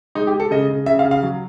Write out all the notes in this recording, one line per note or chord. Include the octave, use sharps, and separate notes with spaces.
G#3 D#4
G4
G#3
A4
C#3 D#5
C#3
C#3 E5
F5
C#3
F5
F#3